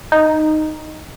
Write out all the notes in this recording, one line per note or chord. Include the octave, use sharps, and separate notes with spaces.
D#4